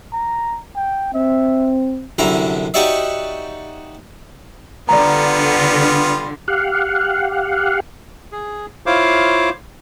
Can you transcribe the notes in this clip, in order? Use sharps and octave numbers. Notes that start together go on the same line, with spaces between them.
A#5
G5
C4 E5
C2 F#2 D3 E4 A#5
D#4 F#4 G4 C#5 D5 E5
D3 G3 B3 F4 D5 A#5
G4 F5 F#5
G#4
E4 F4 C5 C#5 F5 D6